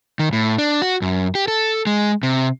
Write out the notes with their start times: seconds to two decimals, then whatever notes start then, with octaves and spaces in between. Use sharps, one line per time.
0.19 D#3
0.33 A2
0.58 D4
0.82 F#4
1.02 F#2
1.35 G4
1.48 A4
1.87 G#3
2.23 C3